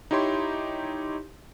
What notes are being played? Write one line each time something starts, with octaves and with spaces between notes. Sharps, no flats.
D#4 E4 G4 C#5 C6